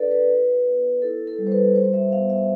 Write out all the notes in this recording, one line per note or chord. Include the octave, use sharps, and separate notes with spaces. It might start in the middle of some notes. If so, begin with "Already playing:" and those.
Already playing: D4 F4 A4 B4 D5
B4
F4
B3
E4 A4
A4
G3
C5
B4
F4 C5
E5
B3 F5
E5